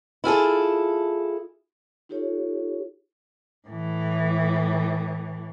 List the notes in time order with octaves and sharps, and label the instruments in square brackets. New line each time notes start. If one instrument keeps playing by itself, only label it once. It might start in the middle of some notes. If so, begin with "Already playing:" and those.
[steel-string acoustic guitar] E4 F4 G#4 A4
[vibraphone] D#4 F4 G4 A4 C#5
[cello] A2 E3